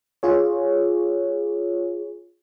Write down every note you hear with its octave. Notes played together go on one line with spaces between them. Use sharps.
F4 G#4 C#5